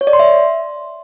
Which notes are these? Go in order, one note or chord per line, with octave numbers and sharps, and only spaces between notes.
C#5
D5
C6
E5